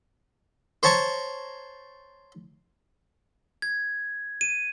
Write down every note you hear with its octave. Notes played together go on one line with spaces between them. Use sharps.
C5 C#5 A5 A#5 C#6
G#6
D#7